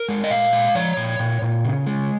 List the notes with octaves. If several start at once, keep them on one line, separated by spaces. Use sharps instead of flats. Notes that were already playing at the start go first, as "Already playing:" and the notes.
Already playing: A#4
G#3
D#5
A#2 F5
G#3
F3 C#5
A#2
A#2
A#2
C#3
G#3